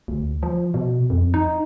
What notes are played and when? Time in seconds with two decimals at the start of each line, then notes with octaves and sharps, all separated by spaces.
0.08 D2
0.43 F3
0.74 B2
1.10 F2
1.34 D#4